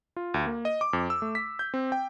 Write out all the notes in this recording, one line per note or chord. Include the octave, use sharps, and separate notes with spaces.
F4
D2
A#3
D#5
D6
F2
E6
A3
B6
G6
C4
G5